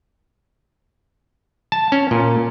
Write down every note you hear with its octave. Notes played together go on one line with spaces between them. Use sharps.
A5
C#4
A#2